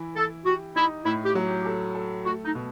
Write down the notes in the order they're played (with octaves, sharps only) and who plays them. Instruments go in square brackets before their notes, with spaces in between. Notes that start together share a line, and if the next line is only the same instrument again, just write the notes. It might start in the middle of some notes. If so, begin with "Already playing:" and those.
Already playing: [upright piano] E3 E4
[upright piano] E3 [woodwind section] A4
[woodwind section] F#4 [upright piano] G4
[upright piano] D#4 [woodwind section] E4
[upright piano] A2 [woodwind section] E4
[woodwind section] G4
[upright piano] F#3
[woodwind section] G4
[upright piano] A4
A4
[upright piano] A3 [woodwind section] F#4
[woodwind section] D#4
[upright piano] B2